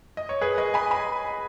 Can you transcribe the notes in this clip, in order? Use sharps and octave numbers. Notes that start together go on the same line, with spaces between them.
D#5
C#5
G#4 B4
B4 D#5
G#5 B5
G#5 B5